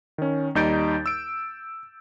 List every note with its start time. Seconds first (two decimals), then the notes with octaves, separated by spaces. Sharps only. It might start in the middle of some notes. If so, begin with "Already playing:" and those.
0.18 D#3 C#4
0.55 D#2 G3 D#4 G6 A6 D7
1.06 E6 D7